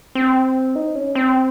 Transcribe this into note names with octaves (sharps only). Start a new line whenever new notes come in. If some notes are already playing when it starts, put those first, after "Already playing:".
C4
D#4
C#4
C4